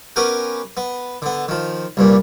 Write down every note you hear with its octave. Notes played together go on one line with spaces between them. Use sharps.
B3 C#4 G4 A#4 B4
B3
D3 B3
D#3 F3
C2 G2 A#2